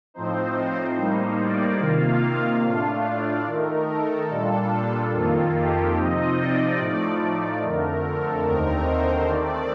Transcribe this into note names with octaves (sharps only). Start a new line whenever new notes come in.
A2 F3 C4 D#4 C5
A2 G3 A#3 D#4
D5
C3 D#3 A#3 F4 F5
A2 A3 D4 F4
D5
D#3 A3 D#4 A#4
A4
A#2 G3 D4 F4 A4
F2 D#3 A#3 F4
G4
C3 F3 C4 D#4 D#5
D5
A2 F3 A3 D#4
F2 D3 A3 A#4
A4
D#2 D3 A3 C4 D#4 A#4
C5
D#3 A3 C4 D5